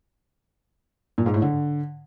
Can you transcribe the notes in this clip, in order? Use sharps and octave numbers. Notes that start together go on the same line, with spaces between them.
A#2
G#2
A2
D3